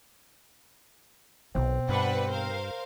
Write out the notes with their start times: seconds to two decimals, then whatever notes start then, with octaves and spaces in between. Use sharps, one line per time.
1.55 B1 B2 C4
1.89 G2 D4 B4 F#5
2.29 A#4 C5 F5